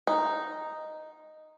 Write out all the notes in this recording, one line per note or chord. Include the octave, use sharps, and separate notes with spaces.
D#4